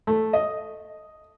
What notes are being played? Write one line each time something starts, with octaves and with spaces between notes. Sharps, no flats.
A3
D#5